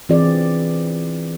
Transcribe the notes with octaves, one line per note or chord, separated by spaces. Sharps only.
E3 C4 F4 G#4 D5